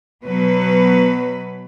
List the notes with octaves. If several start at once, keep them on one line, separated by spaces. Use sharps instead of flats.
B2 F#3 B4